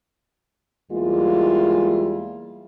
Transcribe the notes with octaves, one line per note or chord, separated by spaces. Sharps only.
E2 G3 G#3 A#3 E4 F4